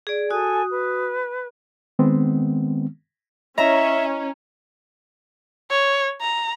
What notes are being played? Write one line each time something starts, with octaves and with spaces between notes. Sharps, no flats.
G#4 D5
F#4 A4 G#5 D#6
B4
D#3 G#3 B3 C4
C#4 E4 C#5 D#5 E5 A#5
C#5
A#5